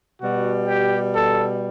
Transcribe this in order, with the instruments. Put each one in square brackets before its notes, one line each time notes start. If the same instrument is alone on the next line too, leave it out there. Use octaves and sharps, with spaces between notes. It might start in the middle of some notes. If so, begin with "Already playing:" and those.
[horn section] B2 G3 F#4
G4
A4